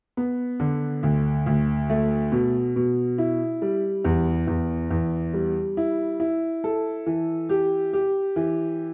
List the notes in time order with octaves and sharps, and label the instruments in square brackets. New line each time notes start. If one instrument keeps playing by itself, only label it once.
[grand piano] B3
D3
D2
D2
A3
B2
B2
E4
G3
E2
E2
E2
G3
E4
E4
A4
E3
G4
G4
E3